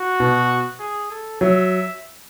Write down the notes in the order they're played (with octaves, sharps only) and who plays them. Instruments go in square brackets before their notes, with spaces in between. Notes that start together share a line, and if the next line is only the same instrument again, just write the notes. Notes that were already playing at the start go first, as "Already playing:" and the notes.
Already playing: [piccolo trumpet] F#4
[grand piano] B2
[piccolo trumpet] G#4
A4
[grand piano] F#3 [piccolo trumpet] E5